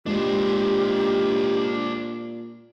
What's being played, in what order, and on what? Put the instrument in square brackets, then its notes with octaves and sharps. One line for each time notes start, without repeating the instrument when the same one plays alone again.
[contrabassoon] A#2 [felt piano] G#3 [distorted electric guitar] D4 C5 [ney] G4